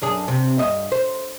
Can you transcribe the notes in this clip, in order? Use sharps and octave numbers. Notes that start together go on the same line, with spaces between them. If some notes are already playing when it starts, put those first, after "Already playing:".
F#2 D4 G#4
C3
G2 D#5 E5
C5